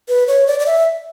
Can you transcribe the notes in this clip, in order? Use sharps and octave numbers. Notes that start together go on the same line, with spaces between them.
B4
C#5
D5
D5
E5